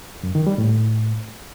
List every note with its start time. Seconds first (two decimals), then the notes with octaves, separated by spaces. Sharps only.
0.23 F#2
0.35 D#3
0.47 G3
0.58 A2